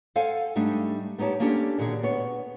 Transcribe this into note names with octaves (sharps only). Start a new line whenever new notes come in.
A4 C5 F5 F#5 G#5
G#2 G3 A3 D4 D#4
B3 D#4 G4 C#5 A5
A#3 C#4 D4 F4 G4 A4
A#2 D3 D#3 F#4 G#4
B3 C#5